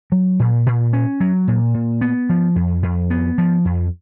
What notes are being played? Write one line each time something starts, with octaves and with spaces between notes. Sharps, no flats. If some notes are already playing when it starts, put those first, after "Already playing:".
F#3
A#2
A#2
C#4
F#3
A#2
A#2
B3
F3
F2
F2
B3
F3
F2